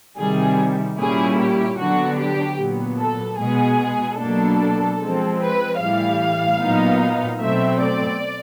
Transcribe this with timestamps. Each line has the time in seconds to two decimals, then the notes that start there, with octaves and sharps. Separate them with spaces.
0.18 C3 D#3 G3 G#4
0.98 A#2 G3 A#3 C#4 E4 G#4
1.39 G4
1.78 D3 F#3 B3 D4 F#4
2.19 G4
2.58 A#2 F#3 B3
2.99 A4
3.39 B2 G#3 B3 G#4
4.19 B2 F#3 A#3 D4 A4
5.00 F3 G#3 C4
5.40 B4
5.79 A2 E3 G3 F5
6.60 A#2 F#3 B3 D#4
7.40 B2 F#3 A3 C4 E5
7.80 D5